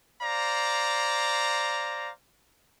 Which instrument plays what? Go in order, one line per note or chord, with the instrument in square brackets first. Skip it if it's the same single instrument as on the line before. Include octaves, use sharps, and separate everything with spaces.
[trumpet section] C5 D5 F5 A#5